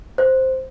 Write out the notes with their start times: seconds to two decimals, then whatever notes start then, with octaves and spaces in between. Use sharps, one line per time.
0.18 C5